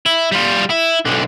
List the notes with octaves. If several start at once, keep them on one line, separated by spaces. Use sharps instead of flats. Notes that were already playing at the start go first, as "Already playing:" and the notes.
E4
G3 F4
E4
B1 D3